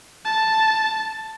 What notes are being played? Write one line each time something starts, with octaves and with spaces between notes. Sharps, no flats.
A5